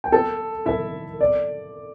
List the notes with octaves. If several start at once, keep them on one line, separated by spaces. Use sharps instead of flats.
G5
A4 A5
E4 E5
D5